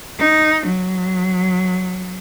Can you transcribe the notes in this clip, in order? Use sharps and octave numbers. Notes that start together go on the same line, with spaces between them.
D#4
F#3